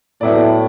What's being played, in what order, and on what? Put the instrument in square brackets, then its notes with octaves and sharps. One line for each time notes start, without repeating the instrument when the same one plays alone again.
[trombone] A2 [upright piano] F#3 B3 E4 D5